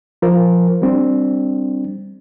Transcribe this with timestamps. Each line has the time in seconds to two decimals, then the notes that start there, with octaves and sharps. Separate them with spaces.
0.22 F3 F4 A#4 C5
0.82 G3 C4 D4